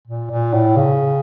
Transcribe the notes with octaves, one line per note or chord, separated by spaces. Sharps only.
A#2
A#2
A2
C#3